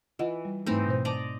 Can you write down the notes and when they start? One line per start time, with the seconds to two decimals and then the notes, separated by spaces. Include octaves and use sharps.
0.19 E3 F4 D#5 F#5
0.45 G3
0.66 G#2 E3 A3 C4 D#4
0.87 B2 C5
1.05 C5 D5 D#5 A5 A#5 D6